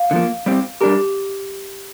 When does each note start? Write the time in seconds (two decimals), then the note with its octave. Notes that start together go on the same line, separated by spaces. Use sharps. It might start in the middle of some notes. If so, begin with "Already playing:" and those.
Already playing: F5
0.11 D3 F3 A#3
0.46 G3 C4 G4
0.81 G3 D4 G4 A#4